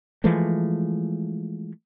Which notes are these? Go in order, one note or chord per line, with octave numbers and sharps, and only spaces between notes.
E3 F3 G#3 A3